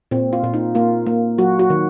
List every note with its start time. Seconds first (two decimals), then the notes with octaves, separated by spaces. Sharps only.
0.11 A#2 C4
0.33 F4
0.44 A#2
0.54 D#4
0.75 A#3 F4
1.07 A#3
1.38 F#3 F#4
1.59 F#4
1.70 D#3